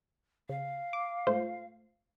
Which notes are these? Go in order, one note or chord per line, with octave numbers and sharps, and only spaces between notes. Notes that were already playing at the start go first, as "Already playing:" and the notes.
C#3 F5
D6
G#2 A3 F4 C5